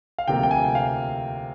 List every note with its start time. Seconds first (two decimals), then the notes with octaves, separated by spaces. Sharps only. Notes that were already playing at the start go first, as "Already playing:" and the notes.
0.18 F5
0.28 D2 C3 F3 A#3 G5
0.43 G5
0.51 G#5
0.75 F5